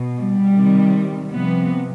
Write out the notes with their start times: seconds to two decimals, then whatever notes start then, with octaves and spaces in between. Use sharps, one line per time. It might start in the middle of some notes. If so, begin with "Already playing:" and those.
Already playing: B2
0.18 G3
0.56 C3 D#3
1.31 C3 F3 B3